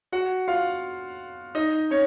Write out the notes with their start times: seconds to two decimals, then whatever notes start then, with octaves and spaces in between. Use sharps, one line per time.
0.12 F#4 F#5
0.48 F4 F5
1.55 D#4 D#5
1.90 C#4 C#5